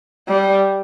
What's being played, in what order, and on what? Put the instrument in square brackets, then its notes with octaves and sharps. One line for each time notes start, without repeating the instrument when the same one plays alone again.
[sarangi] G3